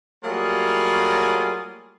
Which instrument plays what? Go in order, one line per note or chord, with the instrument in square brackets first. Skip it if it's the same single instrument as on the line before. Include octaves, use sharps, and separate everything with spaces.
[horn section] F#3 G3 A3 A#3 F4 G#4